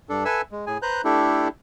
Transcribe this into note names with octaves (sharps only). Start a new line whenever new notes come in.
G2 D4 A4
A4 B4 E5 G#5 E6
G#3
A2 G#4 G#5
B4 C5 A#5 F#6 G6
A3 D4 E4 G4 A4